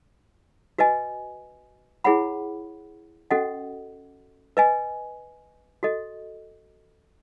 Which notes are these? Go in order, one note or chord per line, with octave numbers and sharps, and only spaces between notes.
F#4 B4 D#5 G#5
E4 G#4 C#5 F#5 B5
C#4 F#4 A4 D#5 F#5
B4 D#5 G#5
F#4 A4 D#5